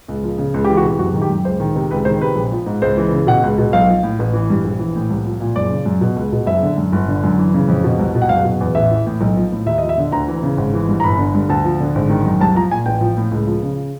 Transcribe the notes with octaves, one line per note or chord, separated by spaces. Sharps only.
C#2
F3
C#3
C#2
E3 G4
F#4
C3
F#1 F#4
D#3
G4
F#2
C#2 C5
D#3
C3
C#2 B4
D#3 C5
C3 B4
A#1
F3
G#2
C#2 C5
E3
C#3
B2 F#5
C#2
B2
B1 F5
F3
A2
A1
E3
G2
A#1
E3
A2
C2
F3
A#2
F#1 D5
C#3
F#2
B2
C#2
B2
F#1 E5
D3
F#2
G1
D3
F#2
E3
C#3
F2
B2
C2
B2
F#5
F#1 F5
B2
E2
A1 E5
E3
A2
B1
F3
A2
D#2 E5
F3 D#5
E5
D3
D2 A#5
E3
C#3
G#1
E3
G2
A#5
G1 B5
D3
G2
D2 A5
F3
D3
G#1
D#3
F#2
C2 A5
F3 A#5
A#2 G#5
A1 G5
F3
A2
C#2
F3
C#3